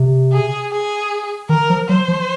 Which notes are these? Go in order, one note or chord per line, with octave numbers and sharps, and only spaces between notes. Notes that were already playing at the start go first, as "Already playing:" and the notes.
Already playing: C3
G#4
G#4
D#3 A#4
F3
F#3 C5
F3